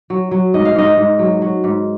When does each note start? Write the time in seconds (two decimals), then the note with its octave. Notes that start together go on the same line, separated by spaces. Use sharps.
0.10 F#3
0.31 F#3
0.54 G#2 D#5
0.65 F5
0.76 G#2 D#5
0.97 G#2
1.19 F#3
1.42 F#3
1.64 G#2